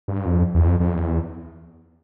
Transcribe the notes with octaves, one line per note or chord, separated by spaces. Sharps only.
G2
F2
E2
F2
F2
E2